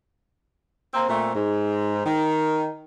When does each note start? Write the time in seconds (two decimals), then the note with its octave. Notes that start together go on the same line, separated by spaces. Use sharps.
0.93 A#3 C4
1.09 A#2 A3 C4
1.34 G#2
2.06 D#3